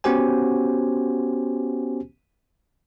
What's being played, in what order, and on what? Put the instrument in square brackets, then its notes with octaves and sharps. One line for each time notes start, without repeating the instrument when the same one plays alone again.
[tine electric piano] B3 C#4 F#4 G4 C5 G#5